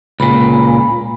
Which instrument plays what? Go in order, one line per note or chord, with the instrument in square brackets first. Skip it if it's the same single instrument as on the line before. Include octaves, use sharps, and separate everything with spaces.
[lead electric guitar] C#2 A#2 [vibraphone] B5